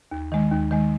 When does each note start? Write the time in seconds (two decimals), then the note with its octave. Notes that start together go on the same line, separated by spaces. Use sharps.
0.11 D#2
0.32 D#3 G#3
0.52 D#2
0.71 D#3 G#3